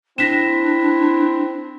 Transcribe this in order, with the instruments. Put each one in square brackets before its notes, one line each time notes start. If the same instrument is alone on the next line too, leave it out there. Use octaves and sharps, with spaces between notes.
[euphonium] C4 [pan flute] D4 [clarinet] E4 [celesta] A#6 B6 E7